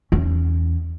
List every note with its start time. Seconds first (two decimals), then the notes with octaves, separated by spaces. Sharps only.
0.12 E2 C#4